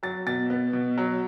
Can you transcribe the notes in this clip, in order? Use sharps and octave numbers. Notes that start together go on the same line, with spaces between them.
F#3 A6
B2 A6
B3
B2
F#3